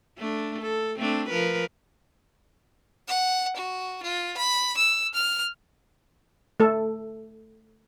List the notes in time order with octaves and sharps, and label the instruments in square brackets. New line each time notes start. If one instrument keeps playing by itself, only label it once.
[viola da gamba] A3 D4
A4
A3 C4 D4
F3 A#4 B4
[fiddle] F#5
F#4
F4
B5
E6
F6
[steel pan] A3 A4